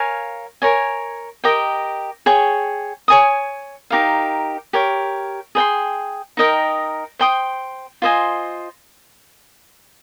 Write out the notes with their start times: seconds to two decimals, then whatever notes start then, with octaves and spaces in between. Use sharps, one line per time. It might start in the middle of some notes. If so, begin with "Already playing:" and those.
Already playing: A#4 C#5 F5 G#5
0.62 A#4 C#5 G#5
1.44 G4 A#4 D#5 G5
2.26 G#4 C#5 G5 C#6
3.08 C#5 G#5 D#6
3.90 D#4 G4 A#4 F5
4.73 G4 A#4 C#5
5.55 G#4 C5 G5 C6
6.37 D#4 A#4 D#5 G5
7.19 C5 G5 C6 D#6
8.02 F4 C5 D#5 G#5